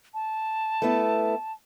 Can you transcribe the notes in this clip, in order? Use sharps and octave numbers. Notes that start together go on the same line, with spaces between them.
A5
A3 B3 E4